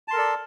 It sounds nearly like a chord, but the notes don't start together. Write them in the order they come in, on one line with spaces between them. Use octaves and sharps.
A5 C6 A#4 A4 D5